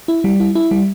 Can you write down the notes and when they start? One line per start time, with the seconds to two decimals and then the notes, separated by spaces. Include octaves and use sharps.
0.08 E4
0.24 G3
0.40 E4
0.55 E4
0.71 G3